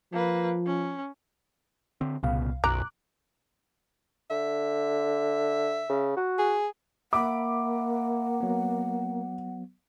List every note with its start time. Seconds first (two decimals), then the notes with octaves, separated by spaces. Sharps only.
0.13 F3 A#3 B4
0.66 C#4
2.01 D3 C4
2.23 C2 A#2 C#3 B3 F5
2.64 B1 F#2 B2 A#5 D6 F#6
4.30 D3 E5
5.89 C#3
6.17 F#4
6.39 G#4
7.13 A#3 E5 F#5 B5 D6
8.41 F#3 B3